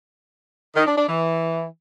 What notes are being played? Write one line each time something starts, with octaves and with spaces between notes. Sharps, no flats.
D#3
D4
D4
E3